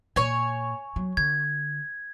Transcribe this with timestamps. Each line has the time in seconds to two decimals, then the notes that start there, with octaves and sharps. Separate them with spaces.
0.16 A#2 C#5 G#5
0.96 F#3
1.17 D3 G#6